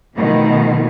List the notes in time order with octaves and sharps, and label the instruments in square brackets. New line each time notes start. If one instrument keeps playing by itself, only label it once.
[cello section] B2 D#3 F3 A3